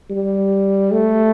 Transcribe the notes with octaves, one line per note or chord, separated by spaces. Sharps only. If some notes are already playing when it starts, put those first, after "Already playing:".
G3
A3